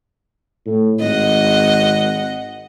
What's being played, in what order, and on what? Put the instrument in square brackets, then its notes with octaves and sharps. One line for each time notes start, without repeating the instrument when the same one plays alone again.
[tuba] A2
[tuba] G#1 [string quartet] D#5 F#5